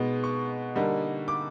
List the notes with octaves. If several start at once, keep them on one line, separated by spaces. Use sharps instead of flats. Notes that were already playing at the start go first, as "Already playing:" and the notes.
Already playing: B2 G#3 B3 D#4
C#6
D3 G3 A#3 D#4
D6